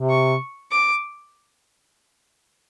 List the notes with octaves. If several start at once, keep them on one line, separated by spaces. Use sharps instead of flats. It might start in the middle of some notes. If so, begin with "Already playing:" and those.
Already playing: C3
C#6
D6